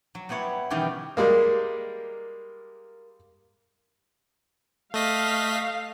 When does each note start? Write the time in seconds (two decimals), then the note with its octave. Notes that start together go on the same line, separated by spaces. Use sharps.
0.15 F#3
0.29 G3 B3 E4 C#5 F#5
0.70 B2 D#3 E3 G3 C#4 G4
1.17 G3 G#3 A#3 A#4
4.94 A3 D#5 F5 B6